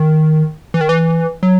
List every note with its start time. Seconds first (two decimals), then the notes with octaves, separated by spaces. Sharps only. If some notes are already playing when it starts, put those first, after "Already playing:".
Already playing: D#3
0.74 E3
0.81 D#3
0.89 E3
1.43 F#3